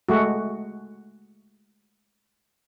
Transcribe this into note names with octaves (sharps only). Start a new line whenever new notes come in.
G#3 A3 F#4